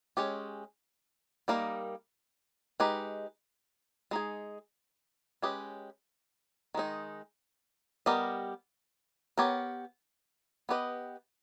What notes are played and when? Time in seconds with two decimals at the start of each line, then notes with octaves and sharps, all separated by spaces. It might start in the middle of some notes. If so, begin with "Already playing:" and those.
0.17 G#3 C#4 G4 C#5
1.48 G3 A#3 D#4 A#4
2.80 G#3 D#4 G4 B4
4.11 G#3 D#4 G#4
5.42 G#3 C#4 G4 B4 D#5
6.75 D#3 G#3 D#4
8.06 G3 B3 G4 A#4 D#5
9.38 B3 G4 A#4 C#5
10.69 B3 G4 B4 D#5